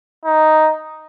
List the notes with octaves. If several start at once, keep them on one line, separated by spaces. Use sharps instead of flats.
D#4